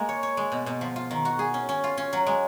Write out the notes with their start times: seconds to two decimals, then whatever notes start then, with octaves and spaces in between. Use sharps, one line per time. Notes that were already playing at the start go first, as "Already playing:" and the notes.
Already playing: G#3 A#3 A#4
0.09 C#5
0.23 C#5
0.37 G#3
0.52 B2
0.66 B2
0.81 F3
0.96 F4
1.11 D#3
1.25 F#4
1.39 G#4
1.54 C#4
1.69 C#4
1.84 F4
1.98 C#4
2.13 F#3
2.27 G#3